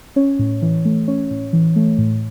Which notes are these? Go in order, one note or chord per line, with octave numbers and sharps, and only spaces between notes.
C#4 C#5
A2
E3
A3
C#4 C#5
A2
E3
A3
A2